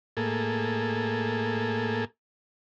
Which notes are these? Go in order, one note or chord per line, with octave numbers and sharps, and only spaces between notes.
A2 A#3 G#4 A4